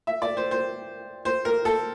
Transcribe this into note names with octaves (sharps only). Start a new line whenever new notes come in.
E5
D5
C5
C5
C5
A#4
A4